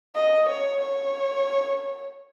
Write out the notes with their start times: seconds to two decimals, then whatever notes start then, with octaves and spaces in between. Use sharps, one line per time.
0.15 D#5
0.49 C#5
0.82 C#5